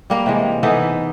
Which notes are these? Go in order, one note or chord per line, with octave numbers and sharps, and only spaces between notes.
G3 A#3 A#4
C3 E3 G#3
E3 B3 D#4 A4